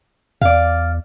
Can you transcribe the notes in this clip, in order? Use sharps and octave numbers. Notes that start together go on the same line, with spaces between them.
E2 D5 F5